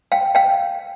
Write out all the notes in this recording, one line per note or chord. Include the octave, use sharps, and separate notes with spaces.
F5 G5
F5 G5